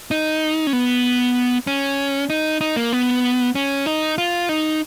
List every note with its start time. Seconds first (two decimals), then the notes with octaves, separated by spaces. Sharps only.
0.11 D#4
0.67 C#4
0.73 B3
1.67 C#4
2.30 D#4
2.61 D#4
2.76 A#3
2.92 B3
3.55 C#4
3.86 D#4
4.18 F4
4.49 D#4